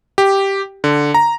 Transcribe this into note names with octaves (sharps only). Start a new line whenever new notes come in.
G4
D3
A#5